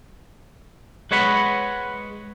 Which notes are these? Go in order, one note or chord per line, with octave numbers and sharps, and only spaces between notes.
G#3 B4 C#5 D#5 F#5 B5